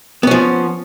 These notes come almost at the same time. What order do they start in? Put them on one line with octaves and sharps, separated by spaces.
B3 C#4 F3